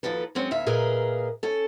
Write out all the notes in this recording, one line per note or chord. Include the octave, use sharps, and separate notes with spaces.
D#2 F3 F#4 A4 B4
F#3 G#3 C4 C#4
D2 B2 E5 F5
A#2 G#4 A#4 B4 D#5 F5
C#4 A4